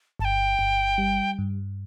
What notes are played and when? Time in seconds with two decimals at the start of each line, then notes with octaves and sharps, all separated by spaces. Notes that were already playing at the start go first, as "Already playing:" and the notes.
0.19 G1 A5
0.25 G5
0.59 G1
0.98 G3
1.38 G2